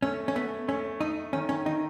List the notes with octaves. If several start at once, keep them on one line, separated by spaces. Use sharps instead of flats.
A3 C#4
C#4
A3 B3
A3 C#4
A3 D#4
D#3 C#4
C#4
D#3 D#4